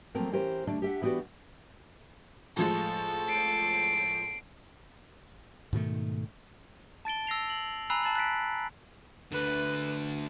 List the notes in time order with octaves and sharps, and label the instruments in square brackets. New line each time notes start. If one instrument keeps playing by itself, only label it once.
[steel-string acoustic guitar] F3 F#3 A3 A#3 C4 A#4
E3 C#4 G4 A#4 C5
D3 G3 A3 D4
G4 E5 F#5
E3 B3 F#4 G4 D5
[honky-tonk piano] A2 F3 G#3 [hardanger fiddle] A4
[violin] C7 D7
[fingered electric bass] G#2 B2 D#3 A3
[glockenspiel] A5 A6 D7 G7
E6 A#6 C7 F7
F#7
G#5 A#5 B5 E6 F#6 C7
A5 A6 C7 F#7
F#6 A6 B6 D7
[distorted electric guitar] D3 A3 [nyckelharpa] B4